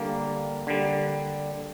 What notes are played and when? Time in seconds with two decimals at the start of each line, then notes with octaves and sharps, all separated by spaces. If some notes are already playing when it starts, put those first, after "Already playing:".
Already playing: D3 G3 A#3
0.67 D3 G3